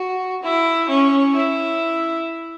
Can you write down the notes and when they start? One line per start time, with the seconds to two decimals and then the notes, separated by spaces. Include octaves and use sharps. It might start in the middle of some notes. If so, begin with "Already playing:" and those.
Already playing: F#4
0.43 E4
0.89 C#4
1.35 E4